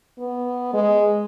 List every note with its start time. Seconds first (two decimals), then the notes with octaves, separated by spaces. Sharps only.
0.19 B3
0.74 G#3